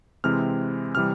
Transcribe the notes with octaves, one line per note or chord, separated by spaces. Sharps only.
C3 E3 G#3 C4 F6
C3 E3 G3 F6